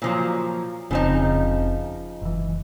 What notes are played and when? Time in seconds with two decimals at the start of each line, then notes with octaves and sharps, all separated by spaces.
0.02 A#2 F3 F#3
0.91 F1 C#3 F3 C4 D#4
2.22 F#1 E3